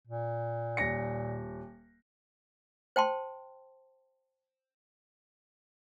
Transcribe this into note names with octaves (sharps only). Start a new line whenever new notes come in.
A#2
D#1 A#6 C#7
C5 G5 A5 C6